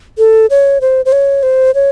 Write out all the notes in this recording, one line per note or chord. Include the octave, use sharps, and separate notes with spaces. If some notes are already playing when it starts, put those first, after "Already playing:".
A4
C#5
C5
C5
C#5
C5
C#5